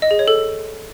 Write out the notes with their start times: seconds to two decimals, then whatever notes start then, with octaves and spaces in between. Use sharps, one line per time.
0.02 D#5
0.11 G#4
0.19 C#5
0.28 A4